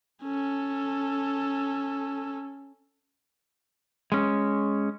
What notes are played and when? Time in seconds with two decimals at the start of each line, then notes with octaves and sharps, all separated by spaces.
0.23 C#4 A4
4.12 G#3 C#4